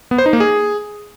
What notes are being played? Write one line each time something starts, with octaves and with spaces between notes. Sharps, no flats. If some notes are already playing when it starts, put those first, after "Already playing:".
B3
C5
D#4
A#3
G#4